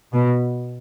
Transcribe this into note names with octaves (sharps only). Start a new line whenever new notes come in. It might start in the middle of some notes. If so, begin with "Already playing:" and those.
B2